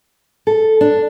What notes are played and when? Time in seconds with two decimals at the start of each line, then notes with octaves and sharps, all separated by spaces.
0.47 A4
0.81 D4